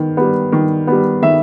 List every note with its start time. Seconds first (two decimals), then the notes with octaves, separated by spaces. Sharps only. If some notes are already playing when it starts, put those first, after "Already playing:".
Already playing: D#3 B3
0.17 G3 B3
0.52 D#3
0.87 G3 B3
1.22 D#3 E5